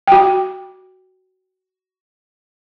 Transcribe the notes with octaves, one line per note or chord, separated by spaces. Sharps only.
F#4 G5